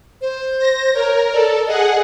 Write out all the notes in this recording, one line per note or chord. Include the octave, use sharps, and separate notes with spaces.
C5
A#6
A#4 C#5
A4 D5
G#4 D#5 F#5